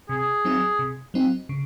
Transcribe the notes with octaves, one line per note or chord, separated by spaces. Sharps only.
C3 G#4
F#3 C4 D#4
C3
F#3 C4 D#4
C#3